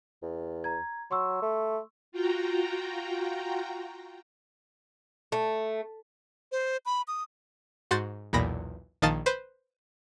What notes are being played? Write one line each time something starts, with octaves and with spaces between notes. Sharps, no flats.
E2
A#5 G#6
F#3 C6 C#6 E6
A3
F4 F#4 G5 A#5
A3
C5
B5
D#6
G#2 F#4 C6 G6 A6 C7
B1 E2 A#2 B5 A#6
A#1 D#3 D#5 F5 A5 A6
B4 C5